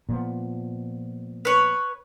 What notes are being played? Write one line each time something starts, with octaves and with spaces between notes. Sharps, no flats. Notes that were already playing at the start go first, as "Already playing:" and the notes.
A#2 F3 B3
B4 C#5